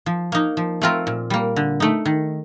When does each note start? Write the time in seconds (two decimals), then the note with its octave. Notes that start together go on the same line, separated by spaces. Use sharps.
0.06 F3
0.32 A#3 D#4
0.57 F3
0.82 A3 C4 F4 A#4
1.07 A#2
1.30 G3 A#3
1.56 D3
1.80 A3 D#4
2.06 D#3